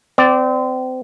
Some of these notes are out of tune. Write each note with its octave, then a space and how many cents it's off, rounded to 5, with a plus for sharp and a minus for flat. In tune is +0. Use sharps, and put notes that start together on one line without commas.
C4 -30 D5 +5